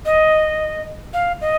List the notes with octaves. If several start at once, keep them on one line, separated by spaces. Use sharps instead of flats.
D#5
F5
D#5